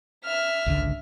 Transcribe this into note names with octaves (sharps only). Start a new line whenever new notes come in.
E5 F6
G#1 C#2 D3